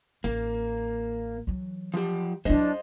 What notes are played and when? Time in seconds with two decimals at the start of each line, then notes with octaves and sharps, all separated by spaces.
0.24 A1 A#3
1.47 E3 F#3
1.94 F3 G4
2.45 F#3 D4 E4 C5 D#5